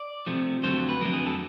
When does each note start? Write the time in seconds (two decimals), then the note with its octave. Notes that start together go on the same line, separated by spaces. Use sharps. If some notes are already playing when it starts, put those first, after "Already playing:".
Already playing: D5
0.27 C3 F3 A3
0.63 F2 D3 F#3 A3 C5
0.89 B4
1.01 F2 D3 F#3 A3 A#4
1.13 G#4
1.26 A4